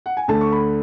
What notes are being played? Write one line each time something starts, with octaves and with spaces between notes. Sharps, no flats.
F#5
G#5
D2 D3 A3 A5
C#6
B5